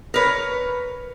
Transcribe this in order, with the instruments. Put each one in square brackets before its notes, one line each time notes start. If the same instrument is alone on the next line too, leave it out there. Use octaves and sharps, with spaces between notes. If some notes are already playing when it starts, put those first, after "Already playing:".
[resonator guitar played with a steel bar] A#4 B4 C#5